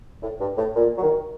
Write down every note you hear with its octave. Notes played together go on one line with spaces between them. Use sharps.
A2
G2
A2
A#2
F#3
D#3